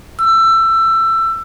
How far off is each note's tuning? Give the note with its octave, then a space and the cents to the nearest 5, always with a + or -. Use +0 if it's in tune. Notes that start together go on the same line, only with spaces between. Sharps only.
E6 +20